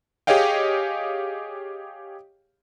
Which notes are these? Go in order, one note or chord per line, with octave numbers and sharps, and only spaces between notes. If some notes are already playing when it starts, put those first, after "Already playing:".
G4 G#4 C#5 D#5 F5 G5